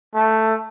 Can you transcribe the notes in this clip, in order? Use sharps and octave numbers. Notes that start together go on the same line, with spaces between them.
A3